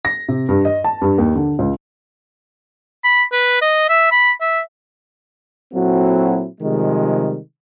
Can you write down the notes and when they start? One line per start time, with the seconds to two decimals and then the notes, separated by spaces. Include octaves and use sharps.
0.05 A#6
0.28 C3
0.49 G2
0.65 D#5
0.84 A5
1.01 G2
1.18 D#2
1.36 D3
1.59 C#2
3.04 B5
3.32 B4
3.62 D#5
3.89 E5
4.11 B5
4.41 E5
5.73 A#2 F#3 C4 E4 F#4 A4
6.61 C3 D#3 F3 G3 G#3